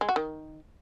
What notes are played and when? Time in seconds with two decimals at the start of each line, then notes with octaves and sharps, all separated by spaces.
0.01 G#3
0.09 F#4
0.16 D#3